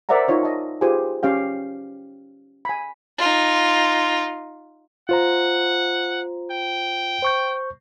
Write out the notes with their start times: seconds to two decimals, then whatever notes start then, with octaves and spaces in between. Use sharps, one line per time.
0.09 A#4 C5 D5 E5 F#5 A#5
0.28 D#4 F4 C#5 D#5
0.43 D#5 A5
0.81 F4 G4 G#4 B4 C5 G#5
1.23 C#4 G4 F5 G5
2.65 G#5 B5
3.18 D#4 F4
5.09 F4 C5 F#5 A#5
6.51 G5
7.23 C5 C#6 G6